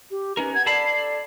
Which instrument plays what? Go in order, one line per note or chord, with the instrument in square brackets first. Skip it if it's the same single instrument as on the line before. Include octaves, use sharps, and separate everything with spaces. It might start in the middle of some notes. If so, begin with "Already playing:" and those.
[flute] G4
[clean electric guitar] C#4 D#4 A#4 [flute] B4
[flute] F#5 [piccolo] G#6
[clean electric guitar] A4 A5 B5 [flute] D5 [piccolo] C7